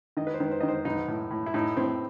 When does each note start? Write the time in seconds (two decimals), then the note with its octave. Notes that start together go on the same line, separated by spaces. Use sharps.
0.17 D#3 D#5
0.27 B4
0.34 C5
0.40 D#3
0.51 C5
0.61 D#3 D#5
0.68 C5
0.85 B1 D#4
1.08 A2
1.31 A2
1.46 E4
1.54 A2 D#4
1.77 A2 C4